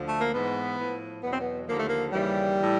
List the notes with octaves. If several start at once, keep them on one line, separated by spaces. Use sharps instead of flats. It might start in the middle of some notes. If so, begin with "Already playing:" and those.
Already playing: D2 D3 F3
A3
A#3
G#2 E3 B3
A2 F3
E2 B2 F#3 B3
C4
B3
D#2 D3 F3 A#3
A3
A#3
D#2 C#3 E3 G3
A2 E3